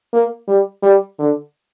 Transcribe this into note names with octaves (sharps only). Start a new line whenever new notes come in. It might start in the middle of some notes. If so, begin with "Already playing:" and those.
A#3
G3
G3
D3